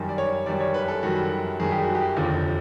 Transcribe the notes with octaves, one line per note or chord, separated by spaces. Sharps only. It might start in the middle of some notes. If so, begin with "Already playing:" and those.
Already playing: F#2 D#3 G3
D5
C#5
F#2 D#3 G3 D5
C#5
B4
A4
F#2 D#3 G3 F#4
F#2 D#3 G3 G#4
G4
F#4
G4
F1 D#2 D3 F3